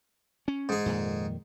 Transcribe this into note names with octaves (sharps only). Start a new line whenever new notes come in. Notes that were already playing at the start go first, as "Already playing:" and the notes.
C#4
G#2 G#4
F2 A#2 D#3